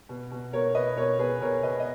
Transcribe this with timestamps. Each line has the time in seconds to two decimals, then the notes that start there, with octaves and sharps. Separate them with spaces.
0.09 B2
0.32 B2
0.53 B2 A#4 C#5
0.75 B2 B4 D#5
0.97 B2 A#4 C#5
1.19 B2 G#4 B4
1.41 B2 A#4 C#5
1.63 B2 B4 D#5
1.80 D#5